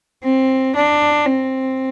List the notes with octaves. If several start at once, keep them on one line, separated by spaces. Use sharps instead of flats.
C4
D4
C4